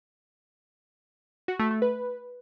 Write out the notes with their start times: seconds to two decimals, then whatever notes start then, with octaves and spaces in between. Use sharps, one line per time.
1.48 F#4
1.59 A3
1.71 A3
1.82 B4